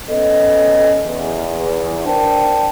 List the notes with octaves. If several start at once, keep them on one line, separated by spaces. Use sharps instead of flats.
B3 C#4 A4 D#5
E2
D4 A#4 C5 D5 G5 A5